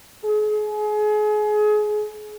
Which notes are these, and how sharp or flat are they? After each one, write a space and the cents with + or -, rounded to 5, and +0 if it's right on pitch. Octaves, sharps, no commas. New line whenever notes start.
G#4 +30